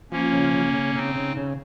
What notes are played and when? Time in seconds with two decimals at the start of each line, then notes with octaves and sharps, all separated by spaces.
0.11 F3 A#3 C#4
0.32 C#3
0.54 C#3
0.74 C#3
0.95 C#3 C4 D#4
1.15 C#3
1.37 C#3